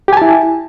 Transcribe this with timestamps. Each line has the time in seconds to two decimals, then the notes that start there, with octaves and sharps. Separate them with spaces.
0.08 G4
0.13 G#5
0.17 A5
0.22 E4